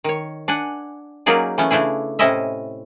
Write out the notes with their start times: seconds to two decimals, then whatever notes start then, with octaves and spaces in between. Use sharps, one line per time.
0.04 D#3 C#5
0.48 D4 F#5 G#5
1.26 F#3 A#3 C#4 D#4 G#4 D5
1.58 E3 A3 B3 C#4
1.71 C#3 A3 D4 E4 G#4
2.19 A2 C3 C#4 E4 D#5 E5